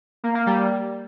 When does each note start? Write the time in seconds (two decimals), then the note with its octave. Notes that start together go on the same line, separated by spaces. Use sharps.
0.24 A#3
0.35 A#3
0.46 G3